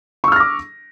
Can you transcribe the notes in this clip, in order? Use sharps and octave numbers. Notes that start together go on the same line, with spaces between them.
C#6 D6 E6 F6 A#6